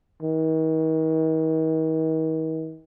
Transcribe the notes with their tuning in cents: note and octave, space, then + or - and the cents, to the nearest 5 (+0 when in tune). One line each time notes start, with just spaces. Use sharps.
D#3 +40